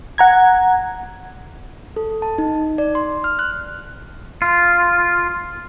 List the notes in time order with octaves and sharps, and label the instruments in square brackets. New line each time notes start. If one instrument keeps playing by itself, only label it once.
[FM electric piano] F#5 A#5 G#6
[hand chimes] A4
A5
D#4
D5
C6
F6
F#6
[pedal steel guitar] F4